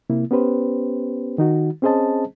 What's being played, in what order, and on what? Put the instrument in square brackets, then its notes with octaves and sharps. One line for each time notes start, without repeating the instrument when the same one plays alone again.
[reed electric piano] C3 A#3 E4
B3 C#4 G4 B4 C5
D#3 D#4 F#4
C4 C#4 G#4 C5 D#5 A5